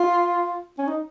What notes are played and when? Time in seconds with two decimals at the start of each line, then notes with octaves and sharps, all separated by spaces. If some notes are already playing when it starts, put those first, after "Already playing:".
Already playing: F4
0.78 C#4
0.87 D#4